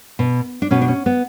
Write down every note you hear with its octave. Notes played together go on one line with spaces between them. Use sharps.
B2
D4
B2 C#4
D4
C#4
B3